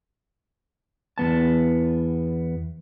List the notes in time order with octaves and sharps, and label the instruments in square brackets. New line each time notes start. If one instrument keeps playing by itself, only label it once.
[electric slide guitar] E2 B3 A5